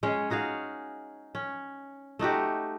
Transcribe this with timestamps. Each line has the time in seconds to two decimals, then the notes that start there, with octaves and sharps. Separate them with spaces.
0.03 G#3 C#4 G#4 C#5
0.30 D#4 F#4 G#4 F5
1.35 C#4
2.19 A3 D#4 F#4 G4